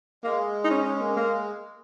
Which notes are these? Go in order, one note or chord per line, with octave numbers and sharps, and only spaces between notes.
G#3 A#3
D#4
C#4
C#4
A#3
A#3